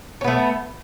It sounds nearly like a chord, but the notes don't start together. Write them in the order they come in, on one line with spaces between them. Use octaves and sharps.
C#4 B3 A3